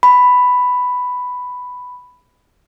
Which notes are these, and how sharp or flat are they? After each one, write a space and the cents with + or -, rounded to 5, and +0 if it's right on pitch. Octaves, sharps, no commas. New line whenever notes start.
B5 +5